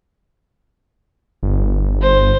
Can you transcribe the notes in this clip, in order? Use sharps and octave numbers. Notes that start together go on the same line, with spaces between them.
G1
C5